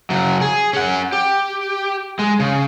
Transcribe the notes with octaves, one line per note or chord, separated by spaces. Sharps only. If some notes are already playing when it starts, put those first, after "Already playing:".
C#3 F#3
G#4
C#4 F#5
G4
G#3
C#3